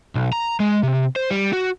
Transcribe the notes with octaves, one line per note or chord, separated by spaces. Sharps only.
B1
A#5
G#3
C3
C5
G3
F#4